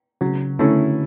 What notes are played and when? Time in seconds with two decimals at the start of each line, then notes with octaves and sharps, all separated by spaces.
0.21 C#3 F#3
0.59 D3 A3 C#4 E4